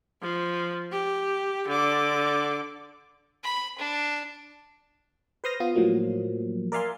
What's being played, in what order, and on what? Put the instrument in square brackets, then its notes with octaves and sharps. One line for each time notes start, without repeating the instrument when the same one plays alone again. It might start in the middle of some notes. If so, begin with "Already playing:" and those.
[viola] F3
G4
D3 D6
[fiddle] B5
D4
[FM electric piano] B4 C5 C6 D#6 F6 A#6
B3 F4 C6 D#6
A2 F3 F#3 A#3
A#4 D5 E5 F5 G#5 C6